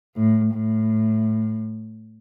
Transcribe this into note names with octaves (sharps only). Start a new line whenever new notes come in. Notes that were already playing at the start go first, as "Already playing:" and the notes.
A2
A2